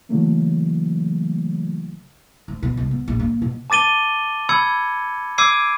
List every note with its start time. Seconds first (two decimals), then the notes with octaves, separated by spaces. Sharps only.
0.09 C#3 E3 F#3 A3 A#3
2.48 D2
2.63 B2
2.77 C2
2.91 B3
3.08 A#1
3.20 A#3
3.42 B2
3.70 A5 D6 A6 D#7 G7
4.49 B5 E6 G#6 C#7
5.38 D6 E6 G#6 C7 D7 D#7